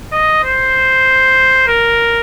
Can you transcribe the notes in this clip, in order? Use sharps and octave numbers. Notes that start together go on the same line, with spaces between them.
D#5
C5
A#4